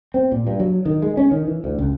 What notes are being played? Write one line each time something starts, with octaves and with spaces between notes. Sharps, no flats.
C4
A#2
G2
F#3
D#3
G#3
C#4
D#3
E3
D2
C#2